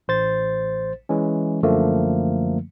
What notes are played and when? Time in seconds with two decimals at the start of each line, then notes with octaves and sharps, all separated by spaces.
0.08 A1 C5 A6
1.09 E3 G#3 C#4
1.63 F#2 D3 F3 A3 A#3